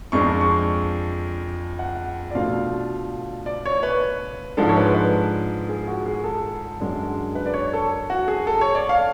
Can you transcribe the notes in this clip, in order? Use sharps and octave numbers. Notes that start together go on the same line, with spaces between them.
F2 F3 G#3 D4 C#6
C#6
F#5
D5
B2 A3 D4 F4 F5
D5
C#5
B4
G#2 F3 G#3 D4 A4
C#5
B4
B4
G#4
F#4
G#4
A4
F#2 D3 G#3 D4
B4
D5
C#5
A4
F#4
G#4
A4
C#5
D5
F5